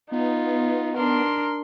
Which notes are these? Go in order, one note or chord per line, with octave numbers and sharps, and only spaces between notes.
B3 D#4 F4
D4 A#4 C6